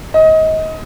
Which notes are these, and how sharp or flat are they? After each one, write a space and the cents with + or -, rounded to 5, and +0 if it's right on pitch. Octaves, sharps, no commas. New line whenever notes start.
D#5 +25